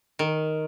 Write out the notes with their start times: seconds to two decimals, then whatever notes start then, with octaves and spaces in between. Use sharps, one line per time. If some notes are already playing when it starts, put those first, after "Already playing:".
0.19 D#3